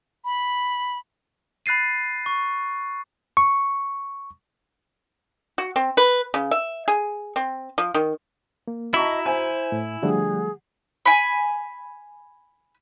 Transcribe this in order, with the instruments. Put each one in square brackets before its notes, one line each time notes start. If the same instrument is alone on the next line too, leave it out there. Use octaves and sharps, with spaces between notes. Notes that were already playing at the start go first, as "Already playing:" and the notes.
[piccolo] B5
[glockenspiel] B5 F#6 A6 C7 D#7
C#6
[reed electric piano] C#6
[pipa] F#4
C4
B4
C#3
E5
G#4
C4
F3
D#3
[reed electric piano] A#3
[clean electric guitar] E4 [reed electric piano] F#4 A#5 [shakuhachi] D#5 [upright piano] A5 C#6 B6
[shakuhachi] C5 [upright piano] G#5
[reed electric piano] A2
[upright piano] D3 [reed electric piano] F3 G3 A3 [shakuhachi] G#4
[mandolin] G#5 B5